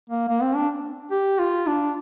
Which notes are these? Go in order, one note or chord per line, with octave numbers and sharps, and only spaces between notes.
A#3
A#3
C4
D4
G4
F4
D4